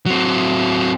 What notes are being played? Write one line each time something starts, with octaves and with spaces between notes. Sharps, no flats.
F#3 C4